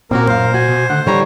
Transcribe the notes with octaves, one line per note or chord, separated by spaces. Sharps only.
A#2 A#3 C4 C#4 F#4 A#4
F#2 C5 F5
F#4 G#5
B2
D3 A3 F#5
D3 E3 G3 C#5 A#5